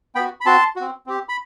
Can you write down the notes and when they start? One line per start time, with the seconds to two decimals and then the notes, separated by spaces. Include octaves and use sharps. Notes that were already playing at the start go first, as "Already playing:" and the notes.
0.15 B3 F#4 G5 B5
0.41 B5
0.46 C4 F#4 A5 C6
0.76 C4 F#4
1.07 C4 G4
1.29 B5